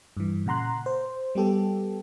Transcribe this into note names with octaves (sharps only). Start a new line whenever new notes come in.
G2 E3
A#2 C#3 F#5 A#5 C6 F#6
C5
G3 B3 G4 A4